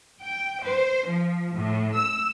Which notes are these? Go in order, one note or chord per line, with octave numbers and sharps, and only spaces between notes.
G5
C5
F3
A2
E6